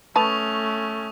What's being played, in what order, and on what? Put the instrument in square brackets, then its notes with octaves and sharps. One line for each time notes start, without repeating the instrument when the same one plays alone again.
[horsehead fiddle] A3 C#4 [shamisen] B4 A5 [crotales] C#6 D#6 F7